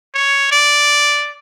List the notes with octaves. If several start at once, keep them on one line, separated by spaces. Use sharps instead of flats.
C#5
D5